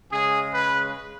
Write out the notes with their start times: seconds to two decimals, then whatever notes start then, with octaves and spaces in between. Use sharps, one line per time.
0.12 C#3 G#3 C#4 G#4
0.53 B4